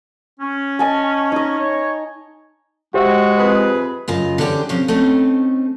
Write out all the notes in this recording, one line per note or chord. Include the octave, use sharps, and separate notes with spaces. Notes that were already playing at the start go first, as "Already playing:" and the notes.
C#4
D#5 G#5 A5
D#4 D#5
C#5
G#3 F#4 G4 C5 E5
F2 G#4 B4
F#2 C#3 F4 D#5
D3 E3 C#4 D4 G4 G#4
C3 F3 C#4 C5
A3 C4 C#4 D#4